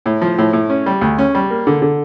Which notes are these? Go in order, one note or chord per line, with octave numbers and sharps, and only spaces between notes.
A2
F3
A2
A2
C#4
G3
D2
C#4
G3
A#3
D3
D3